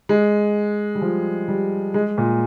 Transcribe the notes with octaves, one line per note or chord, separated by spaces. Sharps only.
G#3
G3
F3
G3
G#3
A#2